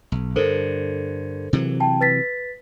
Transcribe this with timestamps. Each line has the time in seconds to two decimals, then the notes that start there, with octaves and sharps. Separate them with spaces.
0.12 B1
0.36 G2 D3 A4 A#4 C5
1.53 C3 E3 F#3
1.80 G5 A5
2.01 B4 A6 B6